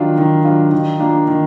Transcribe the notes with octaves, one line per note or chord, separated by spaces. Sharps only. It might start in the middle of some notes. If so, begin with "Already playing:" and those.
Already playing: D#3 F#3 D4 F4
D#3
F#3 D4 F4
D#3
A#3 D4 F4
D#3